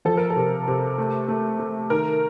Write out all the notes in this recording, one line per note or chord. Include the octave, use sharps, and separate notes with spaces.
F3 A4
A#4
A4
C3
C3
A3
A3
A3
D#3 A#4